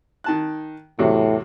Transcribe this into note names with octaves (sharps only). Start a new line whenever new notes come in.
D#3 A5 F#6
E2 A2 C3 F#3